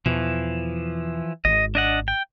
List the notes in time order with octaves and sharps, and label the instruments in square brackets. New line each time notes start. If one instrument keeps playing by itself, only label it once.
[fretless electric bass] E2 B2 [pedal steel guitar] E3 F3
[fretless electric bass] G#1 [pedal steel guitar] D#5
[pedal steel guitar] D4 D#5 F#5
G5